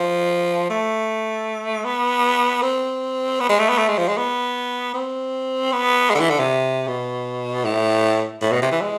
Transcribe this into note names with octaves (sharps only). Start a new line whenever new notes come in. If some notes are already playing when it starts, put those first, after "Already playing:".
Already playing: F3
A3
B3
C4
B3
G#3
A3
B3
A3
G#3
F3
G#3
B3
C4
B3
G#3
D3
E3
D3
C3
B2
A2
A2
B2
C3
E3
G#3